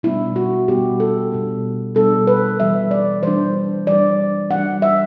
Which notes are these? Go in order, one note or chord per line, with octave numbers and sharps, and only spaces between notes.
B2 G3 B3 D4 E4
F#4
B2 G3 B3 D4 G4
A4
B2 G3 B3 D4
B2 G3 B3 D4 A4
B4
E3 G3 D4 E5
D5
E3 G3 D4 C5
E3 G3 D4 D5
E3 G3 D4 F#5
E5